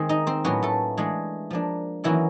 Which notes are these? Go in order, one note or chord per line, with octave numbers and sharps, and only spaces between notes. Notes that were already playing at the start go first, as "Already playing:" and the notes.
Already playing: D#3 G#3 C4
D#4 D#5
C4 C5
A2 F#3 A#3 B3 C#4 B4
A3 A4
E3 G#3 A3 D4 G#4
F3 A#3 D4
D#3 E3 F#3 A#3 C#4 E4